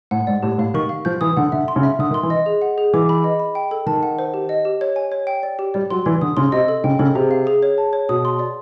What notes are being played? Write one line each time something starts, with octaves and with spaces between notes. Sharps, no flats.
A2 F#5
G#2 D5
A2 G4
A2 F5
D#3 C#6
F5
F3 G6
E3 D#6
D3 F#5
D3 E5
C6
C#3
E5
D3 D#6
D#3
C6
E3
D#5
G#4
F#5
G#4
E3 D6
B5
D#5
B5
G5
A4
D#3 A5
F#5
C5
G4
D#5
G4
C#5
G#5
C#5
G5
D5
G4
G3 D5
F#3 C6
E3 D5
D3 D#6
C#3 C6
C3 D#5
A4
C#3 G5
C#3 A4
C3 G#4
F5
G#4
C#5
A5
C#5
B2 D#6
C6
D5